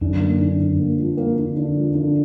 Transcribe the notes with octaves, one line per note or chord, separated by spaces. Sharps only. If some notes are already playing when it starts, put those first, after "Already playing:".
F#2 D3
A#3
D3
D3
A#3
F3
A#3
D3
D3
F3
D3